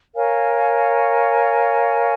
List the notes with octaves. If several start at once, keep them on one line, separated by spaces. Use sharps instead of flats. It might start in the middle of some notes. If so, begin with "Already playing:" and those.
A#4 C#5 F5 G#5